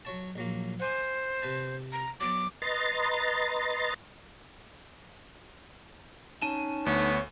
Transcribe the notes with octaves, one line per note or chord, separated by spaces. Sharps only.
F#3 C#5 A5
A#1 F#3 A#3
C5 F#5 G#5 D6
C3 B4 A5
A#5
F#3 B3 D6
B4 D#5 A#5 C6 A6
C#4 D#4 A5 D#7
D2 B3 C#5